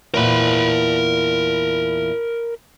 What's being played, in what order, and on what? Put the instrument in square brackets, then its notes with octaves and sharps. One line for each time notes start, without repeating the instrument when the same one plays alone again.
[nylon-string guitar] E2 A#2 [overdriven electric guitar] A#4 B5